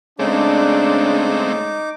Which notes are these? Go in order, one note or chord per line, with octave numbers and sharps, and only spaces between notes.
C#3 G#3 A3 C4 D4 D#4 D6